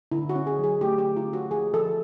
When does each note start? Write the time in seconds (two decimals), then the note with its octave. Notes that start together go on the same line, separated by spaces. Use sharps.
0.12 D3 E4
0.29 F#4
0.35 C#4
0.47 G#4
0.59 F#3 G#4
0.81 A3 G4
0.98 G4
1.05 D3
1.16 F4
1.28 C#4
1.33 F#4
1.51 F3 G#4
1.74 F3 A4